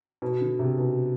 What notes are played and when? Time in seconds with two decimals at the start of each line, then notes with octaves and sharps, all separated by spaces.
0.22 B2
0.41 D3
0.59 C3
0.78 B2